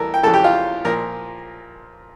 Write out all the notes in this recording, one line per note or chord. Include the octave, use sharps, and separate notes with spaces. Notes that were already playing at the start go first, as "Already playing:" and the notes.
Already playing: E2 E3 G3 A4 A#4
G5
F2 C#3 E3 A4 A5
G4 G5
F4 F5
A#2 F3 A#4 A#5